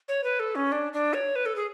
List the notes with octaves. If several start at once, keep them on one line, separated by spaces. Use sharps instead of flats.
C#5
B4
A4
C#4
D4
D4
C#5
B4
A4
G#4